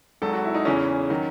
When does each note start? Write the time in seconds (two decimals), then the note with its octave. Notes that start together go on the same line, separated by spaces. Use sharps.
0.22 G#1 G#2 F#3 A4
0.33 F#4
0.44 E4
0.54 D#4
0.65 E2 C#3 E3 C#4
1.10 D#3 F#3